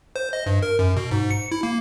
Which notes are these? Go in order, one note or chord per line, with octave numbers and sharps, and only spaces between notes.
C5
D#5
G2
A#4
F#2
B2
G#2
C#7
E4
A#3